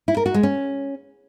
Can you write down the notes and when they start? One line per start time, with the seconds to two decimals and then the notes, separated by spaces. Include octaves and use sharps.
0.08 E4
0.17 A#4
0.26 F#4
0.34 G#3
0.43 C#4